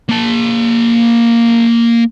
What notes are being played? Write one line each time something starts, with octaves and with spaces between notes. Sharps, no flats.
A#3 A5